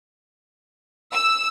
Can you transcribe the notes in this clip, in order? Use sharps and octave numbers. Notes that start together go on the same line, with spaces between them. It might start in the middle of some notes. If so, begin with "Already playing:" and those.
E6